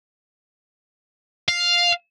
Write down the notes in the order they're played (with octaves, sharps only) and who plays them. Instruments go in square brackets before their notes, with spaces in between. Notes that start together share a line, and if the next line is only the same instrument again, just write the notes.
[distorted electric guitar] F5